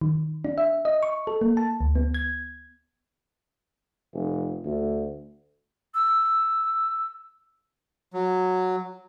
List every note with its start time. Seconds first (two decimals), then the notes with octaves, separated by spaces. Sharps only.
0.01 D#3
0.45 D4
0.58 E5
0.85 D#5
1.03 C#6
1.27 A4
1.41 A#3
1.57 A5
1.81 D2
1.95 B3
2.14 G#6
4.13 F1
4.65 D2
5.94 E6
8.14 F#3